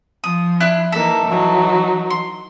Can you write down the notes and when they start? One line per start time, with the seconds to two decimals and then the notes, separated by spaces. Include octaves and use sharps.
0.24 F3 D#6
0.60 D4 E4 F#6
0.92 E3 A#3 D#4 A4 E5
1.26 E3 F#3 D#4
2.10 C6